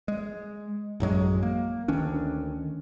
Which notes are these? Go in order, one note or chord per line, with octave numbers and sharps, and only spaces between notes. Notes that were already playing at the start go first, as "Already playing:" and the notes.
G#3
A1 F#2 F#3 G#3
A#3
D2 D#3 C#4 D4